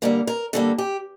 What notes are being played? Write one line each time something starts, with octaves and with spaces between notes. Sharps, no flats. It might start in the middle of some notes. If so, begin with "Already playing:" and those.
D3 G3 A#3 A#4
A#4
D3 G3 A#3 A4
G4